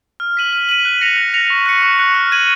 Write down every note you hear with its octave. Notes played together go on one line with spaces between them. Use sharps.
F6
B6 D#7 F#7
F6
B6 D#7 F#7
F#6
A#6 C#7 F7
F#6
A#6 C#7 F7
C#6
F#6 C#7
C#6
F#6 C#7
F6
G#6 D#7 F#7